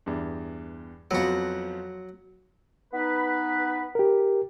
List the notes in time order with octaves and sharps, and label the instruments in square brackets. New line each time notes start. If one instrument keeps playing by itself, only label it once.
[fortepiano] E2 G2
[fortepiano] F2 F3 B3 [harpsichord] F#3 F#4
[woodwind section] B3 D#4 B4
[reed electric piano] G4 A#4